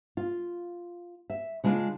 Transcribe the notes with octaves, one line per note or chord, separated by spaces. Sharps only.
F4
E5
C#3 G#3 D4 F4